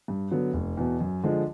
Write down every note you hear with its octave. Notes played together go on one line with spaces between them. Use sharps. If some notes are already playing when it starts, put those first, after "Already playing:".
G2
D3 F#3 B3
F1
E2 B2
F#2
D3 F3 G#3